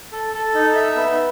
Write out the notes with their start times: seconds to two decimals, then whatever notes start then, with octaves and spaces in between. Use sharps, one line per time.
0.12 A4
0.33 A4
0.54 D#4
0.75 E5
0.96 B3